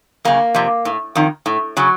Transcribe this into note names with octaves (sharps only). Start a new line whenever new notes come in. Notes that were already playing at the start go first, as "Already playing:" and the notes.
F#2 C#3 A#3
F2 C3
A2
F2 D#3
A2
C#3 F#3